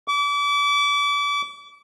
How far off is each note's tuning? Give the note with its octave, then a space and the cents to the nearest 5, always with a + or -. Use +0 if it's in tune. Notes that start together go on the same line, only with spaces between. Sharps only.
D6 -35